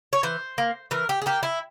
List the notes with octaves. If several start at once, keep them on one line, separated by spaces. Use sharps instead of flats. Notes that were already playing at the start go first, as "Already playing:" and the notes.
C#5
E3 C5
A#3
E3 A#4
G4
G#4
A#3 G4
E4